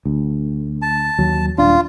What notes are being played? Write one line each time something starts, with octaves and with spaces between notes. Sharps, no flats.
D2
A5
D#2 F#3
D#1 D4 F4